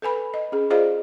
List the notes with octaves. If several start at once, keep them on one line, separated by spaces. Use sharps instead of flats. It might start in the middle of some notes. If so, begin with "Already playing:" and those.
A4 B4 G#5 B5
D#5
C#4 G#4
F4 G#4 C5 D5 D#5 F5